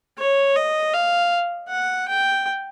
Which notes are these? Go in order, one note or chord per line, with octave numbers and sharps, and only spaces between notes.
C#5
D#5
F5
F#5
G5